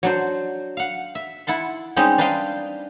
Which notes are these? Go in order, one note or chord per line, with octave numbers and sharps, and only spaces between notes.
F#3 D4 C5
F5 F#5
E5
E4 F#5 A5 C6
G3 G#3 C4 C#4 D#4 G4
D4 B4 C5 D#5 F5 G5